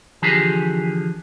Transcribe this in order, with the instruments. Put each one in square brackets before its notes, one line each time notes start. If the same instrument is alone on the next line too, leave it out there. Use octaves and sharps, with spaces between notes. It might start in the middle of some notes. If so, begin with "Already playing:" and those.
[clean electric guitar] D3 E3 F3 G4 G#4